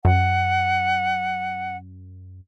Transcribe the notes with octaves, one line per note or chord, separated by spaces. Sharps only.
F#2 F#5